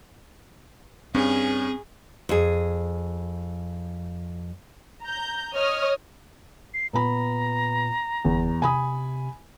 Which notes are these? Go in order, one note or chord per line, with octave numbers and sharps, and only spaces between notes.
G2 C4 C#4 G#4
F2 G#4
A#5 G6
C#5 D#5 D#6 F6
C7
A#2 B3 A#5 B5
F#1 E2
C3 G#5 B5 D#6